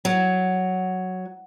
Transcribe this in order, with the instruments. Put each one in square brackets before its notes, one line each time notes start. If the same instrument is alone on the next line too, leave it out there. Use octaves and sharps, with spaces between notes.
[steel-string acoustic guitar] F#3